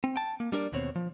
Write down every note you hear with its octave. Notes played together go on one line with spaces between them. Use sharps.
C4
G5 A5
A#3
G3 D4 A#4 D5
D#2 B2 C4 C#5
F3